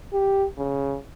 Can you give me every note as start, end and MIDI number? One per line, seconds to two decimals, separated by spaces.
0.13 0.46 67
0.58 0.97 49